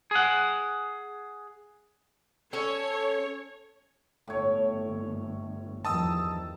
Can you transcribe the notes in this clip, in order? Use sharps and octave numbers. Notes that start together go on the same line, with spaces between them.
G#4 F#5
C#4 A4 C#5
G1 A2 C#5
E2 G2 D#3 F3 A5 D#6 E6